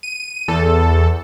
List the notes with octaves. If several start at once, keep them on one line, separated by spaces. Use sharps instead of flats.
D#7
E2 A4